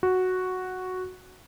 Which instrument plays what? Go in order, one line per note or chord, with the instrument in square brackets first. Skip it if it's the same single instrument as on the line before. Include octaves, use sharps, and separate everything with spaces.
[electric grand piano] F#4